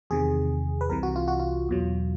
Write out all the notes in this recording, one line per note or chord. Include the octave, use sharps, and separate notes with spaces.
E2 C3 D#3 G#4
B4
C2 C3 E3 A#4
F#4
F4
F#4
F4
E2 B2 F#3